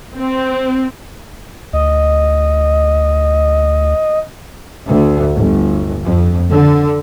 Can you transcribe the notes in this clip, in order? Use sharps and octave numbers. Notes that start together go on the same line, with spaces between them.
C4
D2 D#5
D2
G1
F2
D3